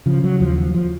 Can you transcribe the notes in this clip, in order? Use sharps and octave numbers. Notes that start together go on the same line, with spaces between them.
C#3 F3
F#3
D#2 F3
F3
F3